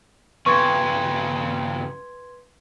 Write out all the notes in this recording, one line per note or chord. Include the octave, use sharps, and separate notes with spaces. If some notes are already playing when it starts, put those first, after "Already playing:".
G2 C#3 B4 C6 C#6 G#6